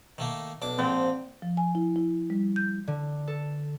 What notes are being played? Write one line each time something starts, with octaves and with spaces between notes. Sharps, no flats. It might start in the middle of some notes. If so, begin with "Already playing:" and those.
D#3 A3 A#3
B1 D4 D6
A#1 G#2 F3 C4
F3
G#5
E4
E4
G3
G6
D3
A4